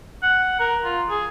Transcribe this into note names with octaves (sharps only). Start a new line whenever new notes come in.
F#5
A#4
F4
G#4